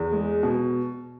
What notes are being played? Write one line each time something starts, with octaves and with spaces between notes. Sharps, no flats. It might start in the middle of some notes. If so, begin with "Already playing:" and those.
Already playing: E2
G#3
B2